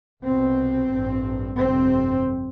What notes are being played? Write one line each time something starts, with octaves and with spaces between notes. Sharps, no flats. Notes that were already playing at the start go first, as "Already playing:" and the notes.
C2 B2 C4
A1 G2
G1 F2 C3 C4